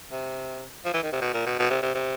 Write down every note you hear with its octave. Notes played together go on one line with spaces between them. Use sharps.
C3
F3
E3
D#3
C3
B2
A#2
B2
B2
C3
C3
C3